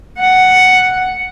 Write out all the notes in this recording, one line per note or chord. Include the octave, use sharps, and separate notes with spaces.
F#5